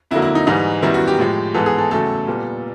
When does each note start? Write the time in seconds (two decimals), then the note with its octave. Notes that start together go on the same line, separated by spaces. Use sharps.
0.11 F2 D3 F#3 A#3 E4
0.22 E4
0.35 D#4
0.47 G#2 E3 G3 D#4
0.82 F#2 D#3 G3 B3 E4
0.94 F#4
1.07 G4
1.19 A2 F3 G#3
1.54 G#2 E3 G#3 B3 A4
1.66 G#4
1.78 A4
1.91 E2 C#3 F#3 A3 A4
2.27 A#2 G3 B3